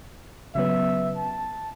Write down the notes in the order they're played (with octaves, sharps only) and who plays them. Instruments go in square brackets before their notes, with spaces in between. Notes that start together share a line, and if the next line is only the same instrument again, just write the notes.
[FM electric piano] C#3 F#3 B3 [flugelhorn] E5
[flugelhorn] A5